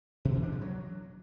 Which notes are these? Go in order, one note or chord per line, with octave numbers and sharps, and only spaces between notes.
B2
E3
D4
F3
F#3